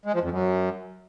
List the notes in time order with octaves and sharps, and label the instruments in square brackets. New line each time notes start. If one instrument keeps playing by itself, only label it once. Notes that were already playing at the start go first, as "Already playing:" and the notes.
[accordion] G#3
F3
F2
F#2